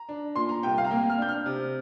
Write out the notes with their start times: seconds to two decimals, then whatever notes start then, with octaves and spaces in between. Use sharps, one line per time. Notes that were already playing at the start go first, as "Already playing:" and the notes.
Already playing: A#5
0.09 D4
0.36 A#2 C6
0.49 A#5
0.63 C2 G5
0.78 F5
0.84 A#5
0.91 A#3 G5
1.10 F6
1.18 D4 G6
1.29 F6
1.46 C3